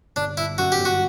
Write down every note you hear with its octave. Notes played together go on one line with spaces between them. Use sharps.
G1 D4
G1 E4
F#2 F#4
G4
G1
F#4